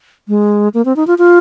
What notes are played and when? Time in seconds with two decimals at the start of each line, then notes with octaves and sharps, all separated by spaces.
0.28 G#3
0.74 A#3
0.85 C4
0.96 D#4
1.07 F4
1.18 F4